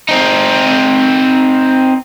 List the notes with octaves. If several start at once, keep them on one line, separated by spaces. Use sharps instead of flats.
C4 D#4